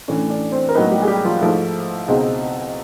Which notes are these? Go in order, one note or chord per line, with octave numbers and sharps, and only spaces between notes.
A2 E3 A3 C#4 D4 C#5
D4 D5
C4 C5
A#4
A2 F#3 A#3 B3 D#4 B4
G3 G4
G#4
G3 G4
F3 F4
G#2 F3 A3 E4
C#2 B2 G#3 C4 D#4